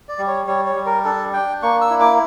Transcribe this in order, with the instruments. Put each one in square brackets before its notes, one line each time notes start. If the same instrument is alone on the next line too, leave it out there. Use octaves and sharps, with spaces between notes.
[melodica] D5
G3
C#5
G3 C#5
C#5
G3
A#4
D4 A4
D4 G5
A#3 C#6
E6
E4
D6